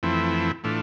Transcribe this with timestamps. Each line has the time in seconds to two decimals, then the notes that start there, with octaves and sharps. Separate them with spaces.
0.03 F2 E3 A3 C4 E4
0.64 A2 E3 A3 D4 F4